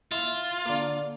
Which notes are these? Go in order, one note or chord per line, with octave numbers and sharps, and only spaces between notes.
E4 F4 E5 B5
D3 A#3